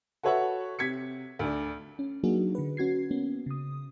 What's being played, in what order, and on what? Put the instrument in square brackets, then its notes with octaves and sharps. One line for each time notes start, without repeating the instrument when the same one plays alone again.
[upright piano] F#4 A4 B4 C#5 E5 F#5
C3 G#6 B6 C#7
D2 D4
[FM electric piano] C#4
F#3 A#3 D4 D#4 F#4 G#4
D3 B4
C#4 F#4 G#6 C7
A#3 B3 C#4
C#3 D#6